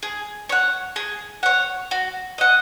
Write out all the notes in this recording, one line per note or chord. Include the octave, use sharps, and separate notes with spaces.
G#4
C#5 F#5
G#4
C#5 F#5
F#4
D#5 F#5